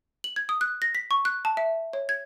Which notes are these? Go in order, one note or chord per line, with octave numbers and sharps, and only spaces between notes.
F#7
G#6
D#6
F#6
A#6
B6
C#6
F#6
A5
E5
C#5
G#6